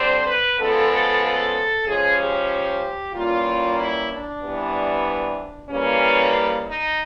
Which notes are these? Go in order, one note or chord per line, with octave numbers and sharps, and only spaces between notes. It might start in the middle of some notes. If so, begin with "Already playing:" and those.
Already playing: D3 G3 C4 C5
B4
C#3 F3 G#3 B3 A4
A4
A4
C#3 F3 G#3 C#4 G#4
G4
E3 G3 A#3 C#4 F4
E4
D4
C3 E3 G3 B3
C#3 E3 G3 A#3 C#4
D#4